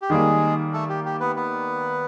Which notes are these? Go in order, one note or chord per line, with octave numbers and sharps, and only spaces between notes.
G4
D#3 G3 G#3 A#3 G#4
A3 A4
G4
G4
B3 B4
B3 B4